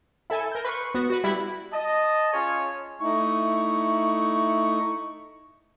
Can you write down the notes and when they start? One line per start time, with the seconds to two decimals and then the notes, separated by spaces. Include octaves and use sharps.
0.30 E4 A4 G#5 E7
0.52 A#4 G6
0.65 B4 C6 C#6
0.95 B3 F#4
1.10 F#4 B4
1.24 G3 E4 B5
1.72 D#5 A5
2.32 C#4 F4 G#4 C#5
3.01 A3 D#4 E4 C#6